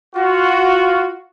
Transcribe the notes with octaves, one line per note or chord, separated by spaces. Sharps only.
F4 F#4